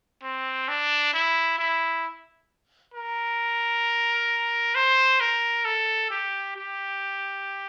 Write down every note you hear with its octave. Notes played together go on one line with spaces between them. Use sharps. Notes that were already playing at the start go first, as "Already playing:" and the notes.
C4
D4
E4
E4
A#4
C5
A#4
A4
G4
G4